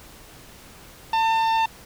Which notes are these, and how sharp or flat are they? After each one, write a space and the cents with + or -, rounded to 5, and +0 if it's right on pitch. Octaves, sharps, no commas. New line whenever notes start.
A5 +35